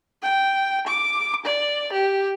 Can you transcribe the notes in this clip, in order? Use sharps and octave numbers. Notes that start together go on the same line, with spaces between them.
G5
D6
D5
G4